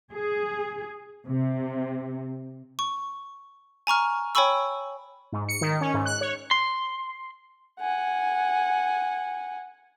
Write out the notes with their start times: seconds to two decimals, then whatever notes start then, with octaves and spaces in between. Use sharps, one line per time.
0.12 G#4
1.25 C3
2.79 C#6
3.87 G#5 A#5 C#6 F6
4.35 C#5 G5 G#5 B5 C#6 E6
5.32 G#2
5.49 C#7
5.61 D#3
5.81 C#4
5.94 G#2
6.05 F#6
6.21 C#5
6.51 C6
7.80 F#5 G#5